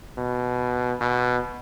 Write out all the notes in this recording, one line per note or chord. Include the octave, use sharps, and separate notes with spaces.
B2
B2